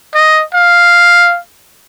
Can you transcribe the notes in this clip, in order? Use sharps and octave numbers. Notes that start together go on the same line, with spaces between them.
D#5
F5